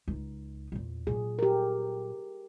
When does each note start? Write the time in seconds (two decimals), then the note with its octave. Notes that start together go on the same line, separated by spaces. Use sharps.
0.08 C#2 D#4
0.72 E2 A#2
1.07 A#2 F#3 G#4
1.39 G4 A#4